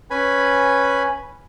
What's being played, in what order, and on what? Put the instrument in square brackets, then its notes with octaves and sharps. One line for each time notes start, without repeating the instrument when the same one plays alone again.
[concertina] C#4 B4 G#5 B5